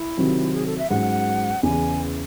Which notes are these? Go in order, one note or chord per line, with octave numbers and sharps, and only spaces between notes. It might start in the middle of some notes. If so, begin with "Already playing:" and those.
Already playing: E4
C3 D#3 F#3 C4
G#4
A4
E5
G#2 F#3 C#4 F#5
E2 C#3 E3 G#5